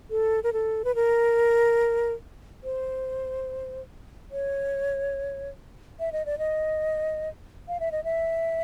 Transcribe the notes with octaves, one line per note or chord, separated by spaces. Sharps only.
A4
A#4
A4
B4
A#4
C5
C#5
E5
D#5
D5
D#5
F5
E5
D#5
E5